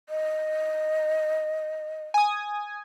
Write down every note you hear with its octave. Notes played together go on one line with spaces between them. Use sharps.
D#5
G#5 D#6